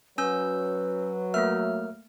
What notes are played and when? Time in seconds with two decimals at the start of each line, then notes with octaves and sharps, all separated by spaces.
0.18 F#3 C#4 B4 E6 G6
1.34 A3 A#3 A#4 E5 F6